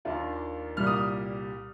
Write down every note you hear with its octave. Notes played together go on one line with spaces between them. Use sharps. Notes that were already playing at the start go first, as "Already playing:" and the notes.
D#2 D#3 A#3 D4 F4
C2 A#2 G3 F6
D#6